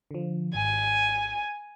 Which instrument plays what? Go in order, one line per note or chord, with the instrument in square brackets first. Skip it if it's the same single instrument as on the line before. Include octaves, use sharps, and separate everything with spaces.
[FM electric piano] D3 F3
[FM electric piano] G#1 [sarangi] G#5